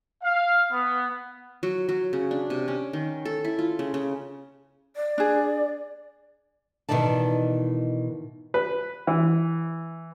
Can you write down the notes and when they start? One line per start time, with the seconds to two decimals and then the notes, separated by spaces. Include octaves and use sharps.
0.23 F5
0.72 B3
1.63 F#3
1.89 F#3
2.13 C#3
2.31 D4
2.50 C3
2.68 C#4
2.93 D#3
3.25 A4
3.45 E4
3.59 F4
3.79 C#3
3.94 C#3
4.96 D5
5.18 D4 G#4
6.89 B2 D#3 E3 D#4 D5 A5
8.54 B4
9.07 E3